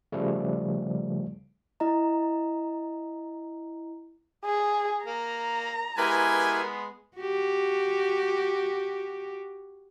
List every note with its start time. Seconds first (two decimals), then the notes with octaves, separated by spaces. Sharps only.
0.12 C#3 F3 G3 A3
1.80 E4 D#5 A#5
4.45 G#4
5.06 A#3 A#5
5.98 G#3 B3 E4 G4 A#4 B4 G#5
7.17 F#4 G4